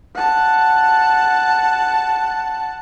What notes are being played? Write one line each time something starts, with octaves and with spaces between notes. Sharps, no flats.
F#5 A5